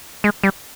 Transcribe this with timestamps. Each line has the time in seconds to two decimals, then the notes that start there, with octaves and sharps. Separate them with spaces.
0.24 G#3
0.43 G3